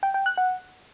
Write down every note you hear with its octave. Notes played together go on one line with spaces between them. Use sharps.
G5
G5
F#6
F#5